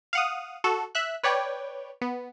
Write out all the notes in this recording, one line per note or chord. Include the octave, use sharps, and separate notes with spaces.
F5 F#5 D#6
F#4 A4
E5 F#6
B4 C#5 D5 G5
B3